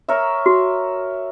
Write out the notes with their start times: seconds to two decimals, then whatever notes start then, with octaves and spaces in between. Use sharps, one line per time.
0.08 A#4 C#5 E5
0.46 F#4